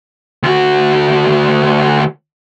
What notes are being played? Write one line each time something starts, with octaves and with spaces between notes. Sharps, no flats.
D2 F#4